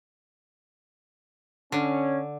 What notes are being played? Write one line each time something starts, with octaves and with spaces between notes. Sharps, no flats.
D3 C#4